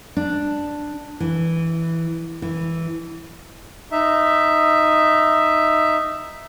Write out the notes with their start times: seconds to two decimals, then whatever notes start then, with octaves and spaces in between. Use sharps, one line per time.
0.17 D4
1.20 E3
2.42 E3
3.92 D#4 E5